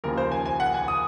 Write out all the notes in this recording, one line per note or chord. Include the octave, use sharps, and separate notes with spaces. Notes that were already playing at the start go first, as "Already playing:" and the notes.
D#2 C#3 F3 A#3 A#4
C5
G#5
G#5
F#5
G#5
D#6